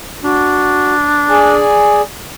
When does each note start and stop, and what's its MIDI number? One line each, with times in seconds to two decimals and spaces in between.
0.24 1.62 62
0.24 0.94 66
1.30 2.01 68
1.30 2.01 74
1.30 2.01 80